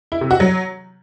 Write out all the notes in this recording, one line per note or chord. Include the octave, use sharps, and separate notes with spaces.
E4
C3
F#4
F#3